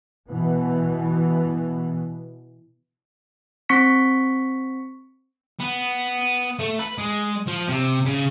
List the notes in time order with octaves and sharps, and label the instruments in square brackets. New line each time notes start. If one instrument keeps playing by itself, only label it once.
[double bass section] B2 E3 B3
[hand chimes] C4 C#6 B6 C#7
[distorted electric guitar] B3
A3
B4
G#3
F3
C3
C#3